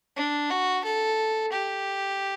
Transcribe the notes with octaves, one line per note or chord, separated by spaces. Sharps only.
D4
F#4
A4
G4